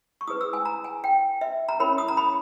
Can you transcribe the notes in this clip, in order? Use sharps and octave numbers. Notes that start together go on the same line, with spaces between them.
C#6
E4 G#4 B4 D#6
E6
G#5
A#5
G#5
G5
E5
A#5
C#4 E4 A#4 C#5 B5
D#6
A#5
B5